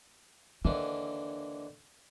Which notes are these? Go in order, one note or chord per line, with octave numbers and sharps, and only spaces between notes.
D#2 D3 E3 D4